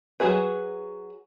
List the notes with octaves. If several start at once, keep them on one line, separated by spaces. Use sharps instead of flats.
F#3 G#3 F#4 G#4 B4